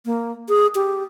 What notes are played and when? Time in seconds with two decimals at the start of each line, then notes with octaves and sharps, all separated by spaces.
0.06 A#3
0.49 G#4
0.75 G4